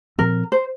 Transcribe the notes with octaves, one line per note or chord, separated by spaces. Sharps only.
A#2 F3 C4 A#4
C5